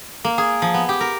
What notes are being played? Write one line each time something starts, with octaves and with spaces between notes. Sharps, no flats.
A#3
G#4
F3
B3
G4
A#4